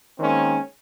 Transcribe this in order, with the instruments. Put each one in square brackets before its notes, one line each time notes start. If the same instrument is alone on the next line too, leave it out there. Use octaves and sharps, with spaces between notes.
[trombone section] D#3 G#3 A#3 C4 C#4